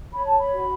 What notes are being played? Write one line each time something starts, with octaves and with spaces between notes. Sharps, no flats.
C#5 B5
A5
B5
F#4